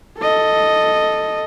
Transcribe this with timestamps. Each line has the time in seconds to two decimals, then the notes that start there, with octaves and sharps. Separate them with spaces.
0.18 A4 D#5